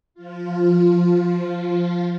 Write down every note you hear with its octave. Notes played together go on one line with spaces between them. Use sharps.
F3 F4